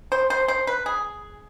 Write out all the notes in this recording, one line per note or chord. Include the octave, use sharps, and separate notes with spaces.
C5
C5
C5
B4
G#4